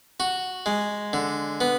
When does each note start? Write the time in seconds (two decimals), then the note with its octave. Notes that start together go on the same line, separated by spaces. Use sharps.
0.20 F#4
0.66 G#3
1.13 D3
1.61 B3